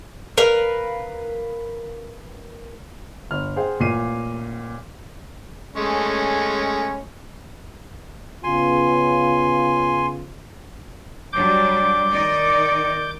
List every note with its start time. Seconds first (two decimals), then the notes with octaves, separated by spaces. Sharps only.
0.38 A#4 B4 F5
3.31 G1 F6
3.56 G#4 C5 F#5 G5
3.80 A1 A#2 C7 D#7
5.76 G#3 A3 C#4
8.44 C#3 B3 F4 G#5 C6
11.33 F#3 G3 D4 D6 G6
12.10 D#3 D#4 D5